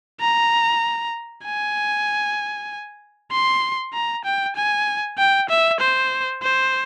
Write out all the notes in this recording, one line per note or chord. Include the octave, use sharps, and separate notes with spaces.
A#5
G#5
C6
A#5
G5
G#5
G5
E5
C5
C5